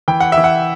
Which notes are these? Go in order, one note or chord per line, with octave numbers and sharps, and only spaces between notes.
E3 G5
F#5
E5
E3
F#5